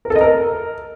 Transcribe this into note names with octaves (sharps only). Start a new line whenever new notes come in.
A#4
A4
D#5
A#4